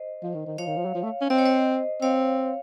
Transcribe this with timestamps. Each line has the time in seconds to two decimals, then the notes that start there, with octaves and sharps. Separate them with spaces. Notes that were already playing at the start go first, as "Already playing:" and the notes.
Already playing: C5 D#5
0.23 F3
0.34 D#3
0.46 D#3
0.58 F3 C#5 F5
0.67 D#3
0.76 F3
0.85 F#3
0.95 F3
1.03 A3
1.21 C#4
1.30 C4 D#5
1.38 C#5
1.46 C5 D#5
2.02 C4 C#5 F5